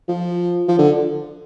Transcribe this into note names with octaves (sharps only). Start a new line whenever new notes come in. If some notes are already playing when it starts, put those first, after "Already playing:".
F3
F3
D3